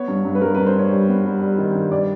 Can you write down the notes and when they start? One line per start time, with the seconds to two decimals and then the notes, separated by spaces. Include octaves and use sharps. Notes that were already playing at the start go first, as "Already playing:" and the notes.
Already playing: B3 C#5
0.08 G2
0.25 G2
0.35 B4
0.41 G2 A#4
0.55 G2 B4
0.66 C5
0.75 G3 C#5
0.91 G3
1.09 B3
1.25 G3
1.41 G3
1.58 D#3
1.75 G2
1.92 G3 D5